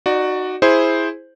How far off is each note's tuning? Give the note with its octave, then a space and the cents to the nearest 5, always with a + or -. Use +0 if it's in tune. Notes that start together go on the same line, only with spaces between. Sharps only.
D#4 -10 F#4 +0 D5 +20
E4 +0 G#4 +0 C5 +0